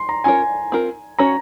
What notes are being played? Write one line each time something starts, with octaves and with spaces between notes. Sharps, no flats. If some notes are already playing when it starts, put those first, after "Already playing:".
Already playing: C6
A#5
C#4 F4 A#4 C#5 G#5
C4 F4 A#4
C#4 F#4 C#5 A#5